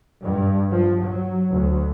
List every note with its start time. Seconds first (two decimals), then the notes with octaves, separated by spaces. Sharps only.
0.23 G2
0.71 F3
1.03 F#3
1.52 D2